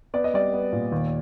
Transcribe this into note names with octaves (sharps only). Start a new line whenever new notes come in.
B3 D5
D#5
G3 D5
B3
A#2
D#2